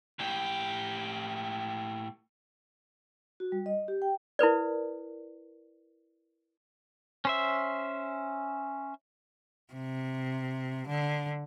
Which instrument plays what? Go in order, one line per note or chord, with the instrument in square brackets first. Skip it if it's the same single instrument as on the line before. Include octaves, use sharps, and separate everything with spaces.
[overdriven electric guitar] A2 G4
[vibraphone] F#4
G3
D#5
G4
G5
[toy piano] E4 A#4 B4 D5
[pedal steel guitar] C#4 C5 E5
[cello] C3
D3